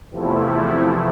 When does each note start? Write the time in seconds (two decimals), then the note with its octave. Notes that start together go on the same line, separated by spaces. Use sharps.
0.11 E2 C3 F3 A3 E4